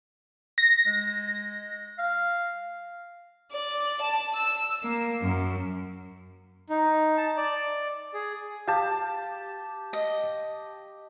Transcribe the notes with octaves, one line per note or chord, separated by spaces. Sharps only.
A#6
G#3
F5
D5
A5
E6
A#3
F#2
D#4
A5
D5
G#4
G4 F5 A5
D#5